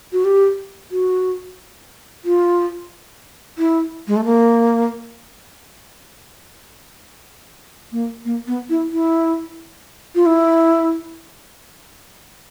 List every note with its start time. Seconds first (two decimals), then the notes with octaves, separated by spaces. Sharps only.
0.13 F#4
0.24 G4
0.91 F#4
2.25 F4
3.58 E4
4.07 G#3
4.16 A3
4.25 A#3
7.92 A#3
8.25 A#3
8.47 B3
8.70 E4
8.92 E4
10.15 F4
10.26 E4